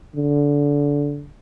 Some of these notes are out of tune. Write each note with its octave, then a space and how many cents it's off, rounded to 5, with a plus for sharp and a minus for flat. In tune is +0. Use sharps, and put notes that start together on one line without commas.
D3 -20